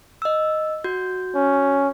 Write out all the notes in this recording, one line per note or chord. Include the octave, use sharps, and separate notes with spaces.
D#5 E6
F#4 G6
C#4